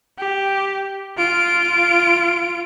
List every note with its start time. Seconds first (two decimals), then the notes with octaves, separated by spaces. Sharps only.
0.18 G4
1.17 F4 D7